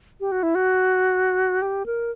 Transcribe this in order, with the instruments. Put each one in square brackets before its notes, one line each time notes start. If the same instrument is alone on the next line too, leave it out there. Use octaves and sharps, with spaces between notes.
[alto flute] G4
F#4
E4
F#4
G4
A#4